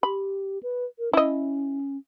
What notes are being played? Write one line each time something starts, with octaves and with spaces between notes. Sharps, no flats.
G4 B5
B4
A#4
C#4 E4 D#5